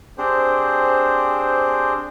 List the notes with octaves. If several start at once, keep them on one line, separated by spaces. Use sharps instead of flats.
C4 D4 G4 G#4 C5